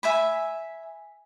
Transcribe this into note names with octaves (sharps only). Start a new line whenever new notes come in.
E5 G#5 B5